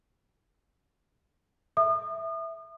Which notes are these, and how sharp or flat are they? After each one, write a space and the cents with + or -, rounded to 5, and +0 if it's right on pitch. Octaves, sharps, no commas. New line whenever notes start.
E5 +0 D#6 -35